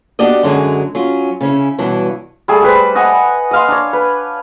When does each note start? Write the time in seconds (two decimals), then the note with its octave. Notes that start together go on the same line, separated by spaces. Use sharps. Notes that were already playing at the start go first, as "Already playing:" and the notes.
0.19 B3 D4 F#4 G4 D5 D#5
0.43 F#2 D3 F#3 G#3
0.95 F#3 C#4 F4
1.40 C#3 C#4 E4
1.78 G2 B2 E3 F#3 E4
2.48 G3 A3 G#4 A4
2.62 G3 B4 C5
2.95 D#5 F#5 G#5 C#6
3.51 D#5 F5 C6
3.68 D4 C#5
3.93 B4